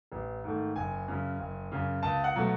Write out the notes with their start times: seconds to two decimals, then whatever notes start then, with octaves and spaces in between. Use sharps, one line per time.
0.12 A1
0.44 G#2 D#3 A3
0.76 F#1 G#5
1.08 F#2 C#3
1.39 F#1
1.72 F#2 C#3
2.03 C#2 A5
2.24 F#5
2.35 B2 F#3 A3